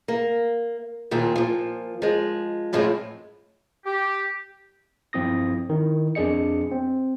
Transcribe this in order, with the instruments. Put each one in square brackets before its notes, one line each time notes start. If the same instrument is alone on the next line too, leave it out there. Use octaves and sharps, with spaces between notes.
[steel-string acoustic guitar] A#3
D#2 A#2 F3 C4
A#2 F3
F3 G#3
F#2 A2 F3 G#3 C4 E4
[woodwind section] G4
[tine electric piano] G2 F3 C4 E4 D#6 A#6
D#3 D#4 E4
F2 D4 G#4 D5 D#5 C#7
C4